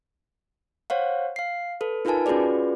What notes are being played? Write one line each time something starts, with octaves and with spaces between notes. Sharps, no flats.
C5 C#5 F5 F#5
F5 C7
A4 B4
D#4 F4 A#4 B4 G#5 A5
C#4 F4 F#4 G#4 B4 D5